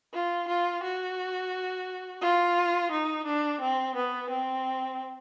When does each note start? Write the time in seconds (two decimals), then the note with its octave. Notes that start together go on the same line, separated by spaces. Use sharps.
0.14 F4
0.48 F4
0.83 F#4
2.22 F4
2.91 D#4
3.25 D4
3.60 C4
3.95 B3
4.30 C4